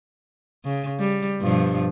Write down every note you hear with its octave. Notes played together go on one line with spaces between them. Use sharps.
C#3
G3
G2 B2 F3